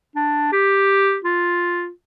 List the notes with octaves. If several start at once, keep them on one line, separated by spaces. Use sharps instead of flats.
D4
G4
F4